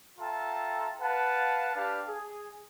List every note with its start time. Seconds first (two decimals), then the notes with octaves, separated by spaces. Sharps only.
0.19 F4 A4 E5 G5 A5 A#5
1.01 B4 F5 F#5 A5
1.75 D4 G4 B4 D5 F5 A5
2.08 G#4